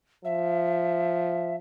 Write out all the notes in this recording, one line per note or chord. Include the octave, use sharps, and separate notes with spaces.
F3 E5